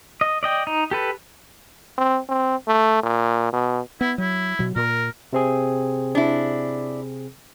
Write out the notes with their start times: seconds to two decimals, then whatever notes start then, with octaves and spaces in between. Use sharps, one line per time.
0.21 D#5
0.43 D5 D#5 G5
0.67 D#4
0.91 G4 A4 B4
1.98 C4
2.29 C4
2.67 A3
3.03 A#2
3.53 B2
4.01 B3 E4
4.18 F#3 E4
4.59 B2 F#3
4.76 A#2 A#4
5.33 C3 C4 G#4
6.15 D4 E4